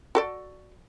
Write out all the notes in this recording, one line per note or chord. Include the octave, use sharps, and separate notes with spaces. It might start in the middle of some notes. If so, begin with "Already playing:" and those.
F#4 A4 D5